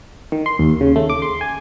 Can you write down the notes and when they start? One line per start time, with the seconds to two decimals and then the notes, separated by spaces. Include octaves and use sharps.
0.32 D#3
0.46 C6
0.59 D#2
0.81 C#3
0.96 A3
1.10 D6
1.22 C6
1.41 G#5